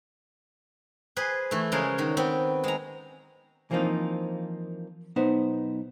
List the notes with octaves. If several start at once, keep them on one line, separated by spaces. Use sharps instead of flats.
G#4 B4 C5
E3 A3
C#3 F3 G#3 A#4 C6
D#3 F#4
B3 C4
G#3 A#5
E3 F3 A#3 C4 D#4 F4
B1 B3 D#4 B4 C5